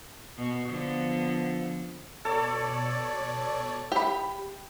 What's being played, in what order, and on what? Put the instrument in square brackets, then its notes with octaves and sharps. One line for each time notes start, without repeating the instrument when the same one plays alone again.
[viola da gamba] B2
[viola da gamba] D3 B3 [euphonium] F3
[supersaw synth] B2 C#5 D5 [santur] A4
[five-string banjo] G4 B5